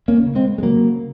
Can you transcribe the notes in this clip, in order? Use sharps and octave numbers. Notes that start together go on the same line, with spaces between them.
A#3 C#4
C#3
G#3 C4
G#3
C#3 F#3 A#3